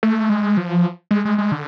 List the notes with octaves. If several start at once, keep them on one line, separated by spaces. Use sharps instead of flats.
A3
G#3
F3
G#3
G#3
G#3
D3